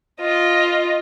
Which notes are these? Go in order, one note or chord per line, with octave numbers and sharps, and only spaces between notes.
F4 D#5